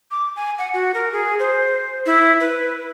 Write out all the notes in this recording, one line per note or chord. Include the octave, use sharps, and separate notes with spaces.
D6
G#5
F#5
F#4
A#4
G#4
C5
E4
B4